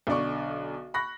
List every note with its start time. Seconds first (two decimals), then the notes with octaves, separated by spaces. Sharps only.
0.07 B1 D3 D5 C#6
0.94 B5 C#6 F#6 A#6